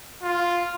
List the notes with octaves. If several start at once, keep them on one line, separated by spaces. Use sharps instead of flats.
F4